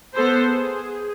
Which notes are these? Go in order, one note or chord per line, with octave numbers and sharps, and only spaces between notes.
B3 A4 C5
G#4